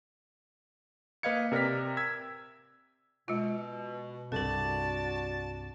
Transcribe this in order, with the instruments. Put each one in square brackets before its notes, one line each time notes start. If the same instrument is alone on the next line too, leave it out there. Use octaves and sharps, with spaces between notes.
[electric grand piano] A#3 B4 D#5 F5 G#6 C#7
C3 A#4 D5 F6 B6
E6 G#6 B6
[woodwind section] B2 [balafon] G#3 F4
[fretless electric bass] C2 G2 C3 [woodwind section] F#4 D5 [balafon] A4 A#4 [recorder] A5